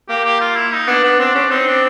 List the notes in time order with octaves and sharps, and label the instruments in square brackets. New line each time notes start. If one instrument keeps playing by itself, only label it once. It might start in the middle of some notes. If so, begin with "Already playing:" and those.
[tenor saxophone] A#3 [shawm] G4
[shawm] G4
F4
E4
D#4
[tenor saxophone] B3 [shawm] D4
[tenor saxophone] B3 [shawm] D4
[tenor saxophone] C4 [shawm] D4
[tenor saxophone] C#4 [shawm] D4
[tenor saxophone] C4 [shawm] D#4
[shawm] D4